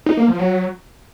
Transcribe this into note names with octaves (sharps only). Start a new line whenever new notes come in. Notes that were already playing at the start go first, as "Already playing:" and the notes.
D#4
A#3
F3
F#3